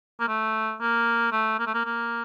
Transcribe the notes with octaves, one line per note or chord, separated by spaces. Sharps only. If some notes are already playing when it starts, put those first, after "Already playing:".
A#3
A3
A#3
A3
A#3
A3
A#3
A#3